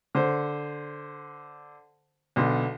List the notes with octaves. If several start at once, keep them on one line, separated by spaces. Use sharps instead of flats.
D3 C5
B1 D3 C6